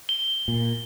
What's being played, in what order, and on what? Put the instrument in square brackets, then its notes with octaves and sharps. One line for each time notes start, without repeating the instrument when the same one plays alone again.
[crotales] G7
[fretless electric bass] A#2